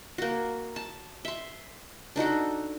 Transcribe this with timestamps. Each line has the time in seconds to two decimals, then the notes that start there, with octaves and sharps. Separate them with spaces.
0.18 A#3 F#4
0.76 A5
1.25 E5 C6
2.16 D4 D#4 F#4 A4